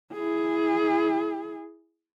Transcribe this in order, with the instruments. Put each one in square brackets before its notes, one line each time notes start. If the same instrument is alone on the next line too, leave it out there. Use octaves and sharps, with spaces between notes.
[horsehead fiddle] E4 G#4